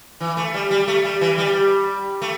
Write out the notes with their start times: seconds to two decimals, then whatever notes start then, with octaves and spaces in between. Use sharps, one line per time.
0.20 E3
0.37 A3
0.54 G3
0.71 G3
0.88 A3
1.04 G3
1.21 E3
1.38 G3
2.22 A3